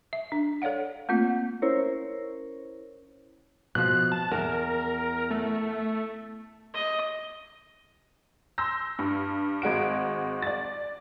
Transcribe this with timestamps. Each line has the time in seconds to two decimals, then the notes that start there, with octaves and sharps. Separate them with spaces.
0.13 E5
0.32 D4
0.62 A4 C#5 D5 F5 F#5
1.09 A3 A#3 C4 F4
1.62 C#4 E4 A#4 C5 C#5
3.75 B2 F3 F#6
4.12 A5
4.32 E2 A#4
5.31 A3
6.74 D#5
8.58 C6 E6 G6 A#6
8.99 G2
9.62 G#1 G#3 F#4 D7
10.42 D5 A6